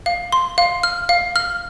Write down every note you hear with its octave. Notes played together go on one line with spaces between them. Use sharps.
F5
C6
F5
F6
F5
F6